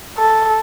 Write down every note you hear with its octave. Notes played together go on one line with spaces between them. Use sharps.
A4